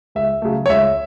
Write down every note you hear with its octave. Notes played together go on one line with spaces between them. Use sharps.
C#2 E5
C#3 F#3 A3
C#5
C#2 E5